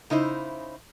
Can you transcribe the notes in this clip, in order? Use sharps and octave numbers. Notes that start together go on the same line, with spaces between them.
C#3 D#4 E4 C5